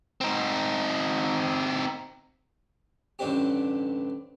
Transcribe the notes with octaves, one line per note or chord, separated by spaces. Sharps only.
C4 D#4
A1 G2 D3 C4 G4